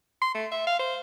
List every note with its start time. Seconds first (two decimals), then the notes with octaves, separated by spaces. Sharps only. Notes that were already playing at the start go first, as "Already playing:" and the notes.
0.22 C6
0.35 A3
0.51 E5
0.67 F5
0.79 C5